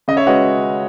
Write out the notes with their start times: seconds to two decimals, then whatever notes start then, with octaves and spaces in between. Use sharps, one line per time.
0.08 C#3 D#5
0.17 C#5 E5
0.27 G#3 C#4 F#4 B4 D#5 F#5